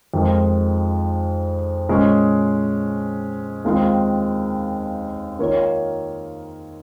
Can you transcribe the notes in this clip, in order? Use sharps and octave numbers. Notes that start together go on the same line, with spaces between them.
F2 D#3 G#3
A#2 G#3 C#4 G#4
D#2 D#3 G#3 C4 F4
D#3 A#3 F4 A#4 C#5